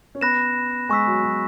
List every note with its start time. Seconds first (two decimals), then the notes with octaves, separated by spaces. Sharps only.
0.15 C#4
0.21 B3 B5 F#6 A#6 E7
0.89 G#3 G#5 C#6 E6 B6
1.07 F#3
1.23 F#3